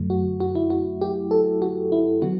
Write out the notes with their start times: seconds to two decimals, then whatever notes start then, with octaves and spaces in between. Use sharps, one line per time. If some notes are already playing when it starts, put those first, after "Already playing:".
Already playing: F#2 D3 F#3 A3
0.10 F#4
0.40 F#4
0.55 E4
0.70 F#4
1.01 G4
1.31 A4
1.62 F#4
1.92 E4
2.22 D3 F#3 B3 F#4